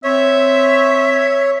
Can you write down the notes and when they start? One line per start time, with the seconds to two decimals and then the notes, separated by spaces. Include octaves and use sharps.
0.04 C4 C#5 E5